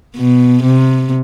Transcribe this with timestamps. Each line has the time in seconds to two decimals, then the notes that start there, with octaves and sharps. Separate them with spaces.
0.17 B2
0.63 C3